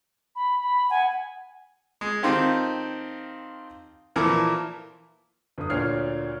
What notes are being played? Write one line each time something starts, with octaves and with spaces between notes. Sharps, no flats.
B5
B5
F#5 G#5
G#3
D#3 C4 D#4 F4 G4 A4
A#2 E3 F3 A4 A#4
G1 D#6
D2 A#2 C#5 F6 C7